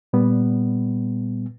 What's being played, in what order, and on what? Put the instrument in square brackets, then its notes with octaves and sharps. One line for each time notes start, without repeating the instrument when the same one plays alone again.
[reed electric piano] A#2 G3 B3